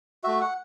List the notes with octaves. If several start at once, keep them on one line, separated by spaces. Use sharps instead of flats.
A3 F#4 E5
F#5